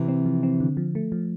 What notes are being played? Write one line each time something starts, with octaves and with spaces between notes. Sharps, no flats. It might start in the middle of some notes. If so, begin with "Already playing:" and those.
Already playing: C3 E3
C4
F3
C4
D3
F3
A3
F3